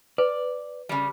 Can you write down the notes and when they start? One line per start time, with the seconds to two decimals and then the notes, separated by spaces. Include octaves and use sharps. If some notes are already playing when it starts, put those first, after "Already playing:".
0.18 B4 D5
0.89 C#3 G3